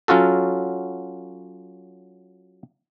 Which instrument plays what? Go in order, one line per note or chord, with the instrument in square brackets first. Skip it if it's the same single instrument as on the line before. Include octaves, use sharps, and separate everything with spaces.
[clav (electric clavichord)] F#3 C#4 F4 F#4 A4